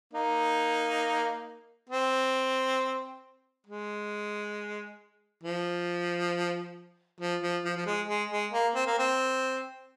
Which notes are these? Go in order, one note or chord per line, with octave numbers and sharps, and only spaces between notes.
A#3 D#4
C4
G#3
F3
F3
F3
F3
F3
G#3
G#3
G#3
A#3
C4
A#3
C4